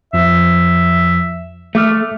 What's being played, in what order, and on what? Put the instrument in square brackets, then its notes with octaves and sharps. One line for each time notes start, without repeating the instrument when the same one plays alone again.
[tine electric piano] F2 F3 [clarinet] E5
[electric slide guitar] A3 [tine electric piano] E5 D6 F6